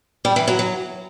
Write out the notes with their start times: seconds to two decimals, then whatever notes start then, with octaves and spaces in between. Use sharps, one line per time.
0.25 G3
0.36 E3
0.48 F#3
0.59 F#3